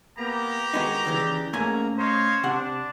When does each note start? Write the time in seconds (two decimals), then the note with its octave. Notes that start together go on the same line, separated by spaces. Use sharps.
0.18 A#3 B3 G4 A#5
0.74 D#3 G#3 B3 D#4 F#4
1.05 D#2 C#3 E3 D5 G6
1.53 G#2 A3 A#3 C#4 G#5 A#5
1.98 C5 C#5 D#5 F5
2.43 C3 D4 F#5